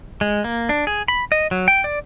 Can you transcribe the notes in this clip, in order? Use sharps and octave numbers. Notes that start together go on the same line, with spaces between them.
G#3
A#3
D4
G#4
B5
D#5
F#3
G5
D5